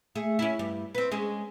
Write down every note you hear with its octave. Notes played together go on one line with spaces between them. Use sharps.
A3 G#4
C#4 E4
G2 G3
C4 B4
G#3 C#4 G#4